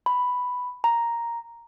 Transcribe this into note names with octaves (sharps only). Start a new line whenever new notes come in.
B5
A#5